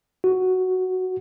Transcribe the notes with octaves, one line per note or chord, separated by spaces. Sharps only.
F#4